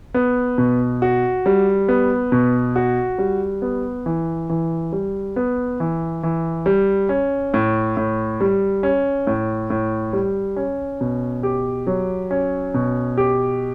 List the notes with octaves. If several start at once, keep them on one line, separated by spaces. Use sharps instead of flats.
B3
B2
F#4
G3
B3
B2
F#4
G3
B3
E3
E3
G3
B3
E3
E3
G3
C#4
A2
A2
G3
C#4
A2
A2
G3
C#4
B2
G4
F#3
C#4
B2
G4